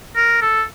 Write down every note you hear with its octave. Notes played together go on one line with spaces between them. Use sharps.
A#4
A4